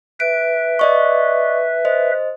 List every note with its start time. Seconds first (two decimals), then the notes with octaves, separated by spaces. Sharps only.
0.20 B4 E5 D7
0.79 D5 D#5 C#6
1.85 C5 D#5